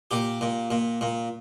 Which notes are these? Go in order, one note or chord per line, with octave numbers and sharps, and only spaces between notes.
A#2 G4
A#2
A#2
A#2